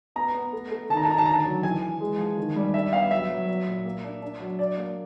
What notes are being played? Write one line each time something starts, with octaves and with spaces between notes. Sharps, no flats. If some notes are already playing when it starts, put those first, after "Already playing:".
B3 A#5
B3
A3
A3
D#3 A5
A#5
A5
D#3 A#5
A5
D3 A#5
A5
F#3
E3 G#5
E3
G#3
F3
D#3
G3
D4 E5
B3 F5
F#3 E5
F#3
F#3
A#2
A#3
D4
D4
F#3
D4 D5
A#3